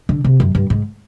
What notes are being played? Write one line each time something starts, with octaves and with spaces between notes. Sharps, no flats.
D3
C3
F#2
G2
G#2